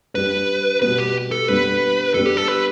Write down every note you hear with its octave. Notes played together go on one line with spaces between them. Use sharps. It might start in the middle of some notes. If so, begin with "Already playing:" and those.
G2 G3 D4 B4
B2 G3 B3 B4
G4
A4
G2 G3 B3 B4
G2 G3 B3 A4
G4
A4
B4